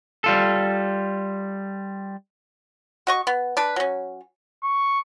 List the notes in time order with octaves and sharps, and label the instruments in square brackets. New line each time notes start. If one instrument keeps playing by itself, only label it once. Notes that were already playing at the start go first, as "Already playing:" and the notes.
[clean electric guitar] G3 F4 A4
[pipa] F#4 D#5 C#6
B3
D4 B4
F#3 C#4
[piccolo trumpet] C#6